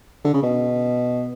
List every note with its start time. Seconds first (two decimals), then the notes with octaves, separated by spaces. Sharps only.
0.24 D3
0.33 C#3
0.43 B2